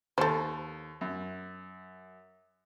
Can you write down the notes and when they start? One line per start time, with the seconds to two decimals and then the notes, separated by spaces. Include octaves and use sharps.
0.18 D#2 A4 C5
1.01 F#2